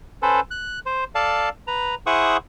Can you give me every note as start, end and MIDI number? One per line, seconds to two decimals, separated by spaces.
0.22 0.40 61
0.22 0.40 69
0.22 0.40 71
0.22 0.40 72
0.51 0.79 90
0.86 1.04 72
1.15 1.49 69
1.15 1.49 74
1.15 1.49 77
1.15 1.49 81
1.67 1.95 71
1.67 1.95 82
2.06 2.37 64
2.06 2.37 68
2.06 2.37 72
2.06 2.37 78
2.06 2.37 85
2.06 2.37 87